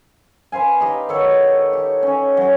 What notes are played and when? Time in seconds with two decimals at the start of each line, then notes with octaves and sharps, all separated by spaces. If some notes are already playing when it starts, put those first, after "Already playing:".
0.52 B4 C5 F5 G#5
0.80 D#4 G4 D#5
1.09 D#3 A4 C#5 F#5
1.73 G4
2.03 C#4
2.37 F#3